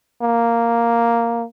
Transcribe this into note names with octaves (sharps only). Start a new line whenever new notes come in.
A#3